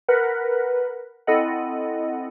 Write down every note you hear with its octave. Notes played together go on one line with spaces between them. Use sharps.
A#4 B4 F#5
C4 E4 A4 D#5 F#5